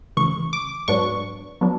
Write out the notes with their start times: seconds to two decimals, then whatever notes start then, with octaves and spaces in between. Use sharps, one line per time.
0.17 D2 C#3 E3 C#6
0.53 D6
0.88 G#2 F#3 B3 D4 C#6
1.61 F#3 B3 D4